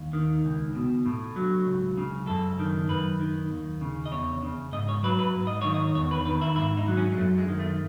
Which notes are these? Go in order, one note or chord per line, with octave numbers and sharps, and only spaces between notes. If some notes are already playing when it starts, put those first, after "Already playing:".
Already playing: D#2
D#3
C#2
B2
A2
F#3
C#2
C#3
F#2 A4
D#3
F#2 B4
D#3
D#2
C#3
D#5
E2 C#5
C#3
G#2 D#5
C#5
F#3 B4
B4
G#2
D#5
D#3 C#5
D#5
E2 C#5
B4
D#3 B4
E4
G#2 E4
D#4
F#3
C#4
G#3
F#2 A3
G#3
D#3
A3